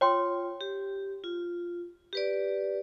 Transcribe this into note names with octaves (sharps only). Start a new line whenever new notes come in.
F4 C#5 G5 C6
G4
F4
G4 B4 D5